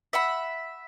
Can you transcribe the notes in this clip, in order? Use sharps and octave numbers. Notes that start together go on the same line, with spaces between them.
E5 F#5 B5